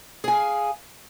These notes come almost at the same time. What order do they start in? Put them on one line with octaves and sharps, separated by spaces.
G#4 G#5 F5